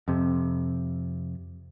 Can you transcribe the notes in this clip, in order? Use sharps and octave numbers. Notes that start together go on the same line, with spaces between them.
F2 C3